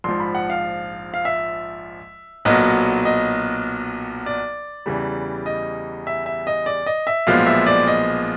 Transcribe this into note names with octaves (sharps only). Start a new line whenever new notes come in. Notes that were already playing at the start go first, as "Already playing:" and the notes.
A#1 G#2 F3 C6
B5
F#5
F5
F5
E5
B1 A#2 F#3 B3 D#5
D#5
D5
E2 C#3 E3 G3
D#5
E5
E5
D#5
D5
D#5
E5
B1 A#2 F3 G#3 B3 F5
E5
D5
D#5